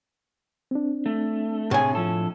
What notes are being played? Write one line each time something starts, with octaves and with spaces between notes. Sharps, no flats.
C4 D4
A3
A2 C3 G#4 G#5
F3 A4